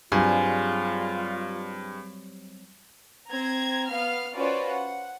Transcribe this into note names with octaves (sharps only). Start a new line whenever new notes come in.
G2 F#3 G3 C4 F4 G#4
C4 A#5 G#6
B3 F5 F6
C#4 F4 F#4 B4 C5 D5
F#5